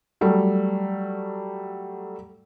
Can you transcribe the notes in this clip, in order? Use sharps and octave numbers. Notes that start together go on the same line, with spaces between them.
F#3 G3 A3